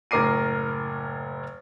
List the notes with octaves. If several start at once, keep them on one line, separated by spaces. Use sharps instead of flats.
F#1 A2 A#4 D6 C7 D#7